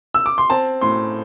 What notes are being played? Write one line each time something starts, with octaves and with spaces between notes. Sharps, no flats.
E6
D6
C6
C4 A5
A2 C6